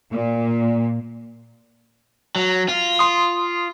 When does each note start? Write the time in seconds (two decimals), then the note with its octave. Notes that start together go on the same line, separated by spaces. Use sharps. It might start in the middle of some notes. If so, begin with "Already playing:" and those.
0.11 A#2
2.36 F#3
2.69 F4
2.99 C6 D#6